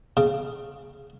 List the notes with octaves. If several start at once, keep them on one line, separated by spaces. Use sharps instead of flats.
C#3